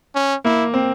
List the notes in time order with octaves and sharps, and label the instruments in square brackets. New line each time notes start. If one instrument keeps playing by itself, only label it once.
[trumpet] C#4
[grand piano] A#3 [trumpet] E4
[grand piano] C4